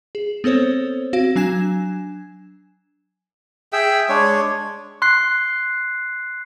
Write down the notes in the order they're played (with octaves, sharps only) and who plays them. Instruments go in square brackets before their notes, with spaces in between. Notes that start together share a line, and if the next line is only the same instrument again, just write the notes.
[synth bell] G#4
B3 C4 A4 C5 C#5
C4 F#4 F5
F#3 D4 G#5 G#6 E7
[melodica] G#4 E5 G5
G#3 D4 C#5
[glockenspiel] C6 F#6 C7